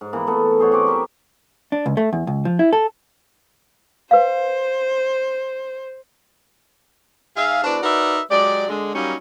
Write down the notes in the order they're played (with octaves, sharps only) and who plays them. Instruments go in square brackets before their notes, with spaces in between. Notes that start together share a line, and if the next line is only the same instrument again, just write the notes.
[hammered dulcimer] G#2
E3 A#3 B3
A3 B3 A4
G#4 C5 C#5 F#5
C4 F#4 D6
G4 A#4 C5 E5
[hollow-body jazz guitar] D4
C#2
A3
E2
C#2
F3
E4
A4
[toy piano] B4 F5 [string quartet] C5
[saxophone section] G#2 G#4 E5 F5
E2 D4 F#4 B4 C5 D5
D#4 F#4 A#4 B4 D5 E5
F#3 G#3 G4 D5
D3 G#3
F#3 G3 A#3 C#4 D#4